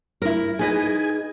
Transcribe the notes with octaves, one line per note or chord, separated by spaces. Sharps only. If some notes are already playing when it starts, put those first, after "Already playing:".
E4 A#4
D#4 G#4 B4 D#5 G#5